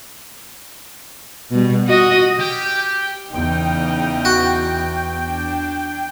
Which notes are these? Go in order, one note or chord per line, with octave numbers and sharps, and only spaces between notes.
B2 G3
F#4 D#5
C#4 G4 G5
E2 C#3 D#4 G5
F#4
D4